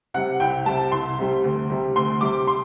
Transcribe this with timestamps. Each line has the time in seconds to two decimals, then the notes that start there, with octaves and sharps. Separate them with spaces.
0.14 C3 G3 F#5
0.40 C2 G5
0.66 C3 G3 A5
0.92 C2 C6
1.18 C3 G3
1.44 D2
1.70 C3 G3
1.96 D2 C6
2.21 C3 G3 D6
2.47 C6